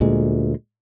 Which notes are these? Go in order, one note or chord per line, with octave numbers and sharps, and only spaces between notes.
D2 A#2 G#3